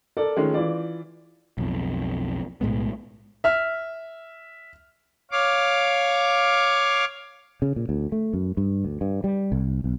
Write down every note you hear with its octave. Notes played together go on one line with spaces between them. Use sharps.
A4 A#4 D5
D#3 F3 G#3 A3 C#4
E3 F4 D5
B1 F2
B1 A2 G#3 B3
E5 F6
C#5 F5 D6
C#3
A#2
D2
A3
F#2
G2
D2
G2
G3
C2
B1